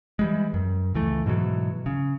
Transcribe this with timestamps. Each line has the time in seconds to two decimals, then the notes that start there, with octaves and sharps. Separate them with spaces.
0.19 E3 G3 G#3
0.54 F#2
0.94 C#2 E3 A3
1.26 G#2 B2 E3 F#3
1.86 C#3